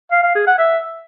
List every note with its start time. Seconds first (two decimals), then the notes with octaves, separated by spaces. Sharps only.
0.12 F5
0.24 F5
0.35 G#4
0.47 F#5
0.59 E5